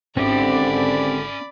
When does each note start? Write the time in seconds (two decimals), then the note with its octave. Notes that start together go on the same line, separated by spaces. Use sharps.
0.17 G#1 D3 C4 C#4 G4 D5 E5 B5